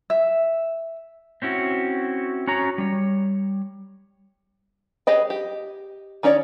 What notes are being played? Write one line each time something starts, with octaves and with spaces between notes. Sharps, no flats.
E5
C4 C#4 E4 F#4
C#4 F#4 C#5 A#5
G3 C#5
G4 G#4 B4 D#5 G5
G4
D#3 C#4 C#5 D5